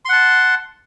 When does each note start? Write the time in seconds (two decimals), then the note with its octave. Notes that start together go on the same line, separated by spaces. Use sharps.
0.05 C6
0.09 F#5
0.13 A5